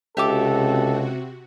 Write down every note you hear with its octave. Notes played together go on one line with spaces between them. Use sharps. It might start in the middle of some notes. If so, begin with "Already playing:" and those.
C#2 C3 F#4 G4 A4 E5 D6